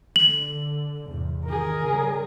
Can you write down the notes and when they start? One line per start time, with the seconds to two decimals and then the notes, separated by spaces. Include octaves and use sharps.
0.16 D3 F#7
1.07 E2 G#2 C3
1.45 D#3 G#4 A#4
1.87 C#3 G3